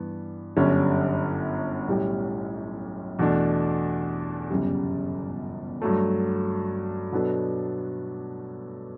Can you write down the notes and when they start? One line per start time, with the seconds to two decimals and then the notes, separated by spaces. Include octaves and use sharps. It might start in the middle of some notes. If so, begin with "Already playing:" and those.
Already playing: G2 E3 B3
0.56 G1 F#2 D3 G3 C#4
1.88 B1 A2 G3 C#4 G4
3.19 E2 B2 A3 D4
4.50 G1 F#2 C#3 G3
5.82 G2 F#3 A3
7.12 B2 F#3 B3 D4 A4